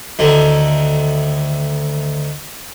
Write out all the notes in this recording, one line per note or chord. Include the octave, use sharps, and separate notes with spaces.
D2 D#3 A3